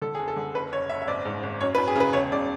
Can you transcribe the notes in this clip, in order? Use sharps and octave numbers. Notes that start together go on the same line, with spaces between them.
D3 A4
G#4
F#1
A4
D3
F#1 B4
F#1 C#5
F#1 E5
E5
G#1 D5
G#2
G#1
F#2 C#5
B4
F#2
G#4
C#3 B4
E1 C#5
C#3 D5